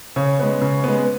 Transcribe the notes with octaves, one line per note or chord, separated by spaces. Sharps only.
C#3 C#5
G#3 B3
C#3
G#3 B3